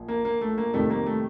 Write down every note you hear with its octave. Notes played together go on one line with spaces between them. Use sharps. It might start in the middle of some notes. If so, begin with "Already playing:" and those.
Already playing: A#1 A#2 F3
A#3
A#3
A3
A#3
F2 C3 D#3 G3 A3
A#3
A3